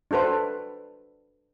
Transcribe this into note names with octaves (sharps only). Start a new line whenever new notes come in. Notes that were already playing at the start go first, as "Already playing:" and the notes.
D4 F#4 A4 B4 C5